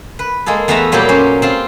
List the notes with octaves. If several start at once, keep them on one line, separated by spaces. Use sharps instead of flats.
B4
G#3 A#3 G#4 A4
E2 A3 B3 B4 E5 A#5
A#2 F#3 G3 A#3 G4 G5
C#4 C5
C4 F4 C6